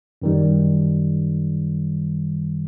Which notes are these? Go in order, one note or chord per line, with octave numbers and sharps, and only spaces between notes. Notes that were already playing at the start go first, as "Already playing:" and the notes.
F#2 D#3 G3